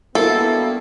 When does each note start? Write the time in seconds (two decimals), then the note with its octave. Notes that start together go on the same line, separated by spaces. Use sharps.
0.15 G2 A#3 B3 E4 F#4 A4